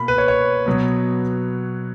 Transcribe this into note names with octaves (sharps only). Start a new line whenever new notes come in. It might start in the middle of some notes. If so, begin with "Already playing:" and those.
Already playing: B2 A#3 B5
B4
C#5
C#5
B2 F#3 B3